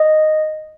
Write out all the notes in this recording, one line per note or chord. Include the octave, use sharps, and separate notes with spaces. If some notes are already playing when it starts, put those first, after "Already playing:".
Already playing: D#5